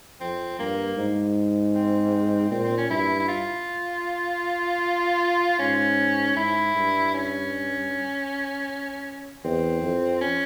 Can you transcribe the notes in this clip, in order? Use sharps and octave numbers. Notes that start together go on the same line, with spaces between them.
F2 C4
G2 A#3
G#2
C4
A#2 C4
C4
C#4
G2 E4
E4
F4
G#2 C#4
G#2 E4
G2
C#4
E2 C4
F2
C#4